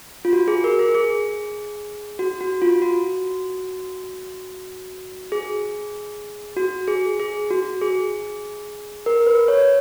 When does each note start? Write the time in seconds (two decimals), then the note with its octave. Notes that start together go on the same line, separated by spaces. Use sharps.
0.25 F4
0.33 F#4
0.48 G#4
0.64 A#4
0.79 G#4
0.95 G#4
2.19 F#4
2.41 F#4
2.62 F4
2.82 F#4
5.32 G#4
6.57 F#4
6.88 G#4
7.20 G#4
7.50 F#4
7.81 G#4
9.06 A#4
9.27 B4
9.48 C#5